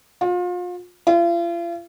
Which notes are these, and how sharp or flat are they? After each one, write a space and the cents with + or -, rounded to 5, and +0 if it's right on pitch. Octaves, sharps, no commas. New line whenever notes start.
F4 +35
F4 -40